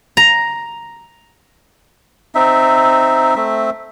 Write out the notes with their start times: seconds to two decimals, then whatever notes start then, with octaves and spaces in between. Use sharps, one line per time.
0.17 A#5
2.35 C4 D#4 E5
3.36 A3 C4 E5